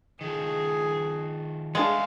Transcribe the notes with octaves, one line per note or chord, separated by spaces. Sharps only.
D#3 F3 G#4
G#3 A3 B3 D4 G#4 F5 C7